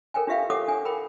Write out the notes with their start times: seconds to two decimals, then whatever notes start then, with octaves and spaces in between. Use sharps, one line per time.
0.14 A4 A#4 C#5 G5 G#5
0.27 D4 F4 G4 E5 F5 G5
0.50 G4 A4 C#5 F#5 D6 D#6
0.68 D4 G#5
0.85 A#4 G5 B5